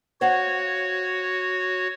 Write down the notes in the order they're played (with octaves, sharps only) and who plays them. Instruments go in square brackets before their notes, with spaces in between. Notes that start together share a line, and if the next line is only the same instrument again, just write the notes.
[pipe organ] F#4 C#5 [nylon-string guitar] C5 F5 F#5